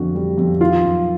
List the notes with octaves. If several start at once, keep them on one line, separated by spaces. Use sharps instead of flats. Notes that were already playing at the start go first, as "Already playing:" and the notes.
Already playing: F2 D3 F#4
G3
F2
D#3 F4
F#2